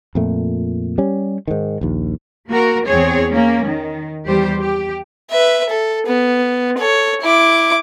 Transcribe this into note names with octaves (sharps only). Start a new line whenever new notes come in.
F2 A#2 A3
G3 C#4
G#2 D#3
A#1 D#2
A#3 F#4 A#4
E2 C4 G#4 C#5
A#3 C#4
D#3
E2 G3 G4 C5
G4
B4 E5
A4
B3
A4 C#5
E4 D6